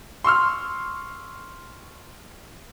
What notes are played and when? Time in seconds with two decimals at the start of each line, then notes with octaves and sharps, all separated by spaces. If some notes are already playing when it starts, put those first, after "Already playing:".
0.24 C6 C#6 E6 F6